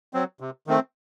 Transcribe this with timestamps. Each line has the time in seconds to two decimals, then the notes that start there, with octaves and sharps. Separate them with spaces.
0.13 F#3 C4
0.40 C3
0.67 D#3 A3 C4